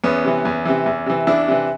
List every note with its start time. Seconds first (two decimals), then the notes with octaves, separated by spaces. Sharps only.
0.04 E2 B3 C#4
0.24 C3 E3
0.45 E2
0.65 C3 E3
0.86 E2
1.06 C3 E3
1.27 E2 D4 E4
1.48 C3 E3